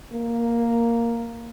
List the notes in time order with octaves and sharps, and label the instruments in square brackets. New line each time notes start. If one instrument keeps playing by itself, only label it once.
[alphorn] A#3